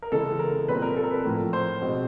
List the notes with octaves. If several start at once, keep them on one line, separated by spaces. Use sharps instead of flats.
A#4
C#3 E3 G#3 B3 A4
A#4
A#2 G3 C4 B4
A#4
A4
A#4
B4
A2 F3 A#3
C5
B2 G#3 C4